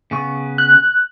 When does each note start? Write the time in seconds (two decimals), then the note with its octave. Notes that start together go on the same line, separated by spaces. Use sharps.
0.11 C#3 B3 C#6
0.58 F#6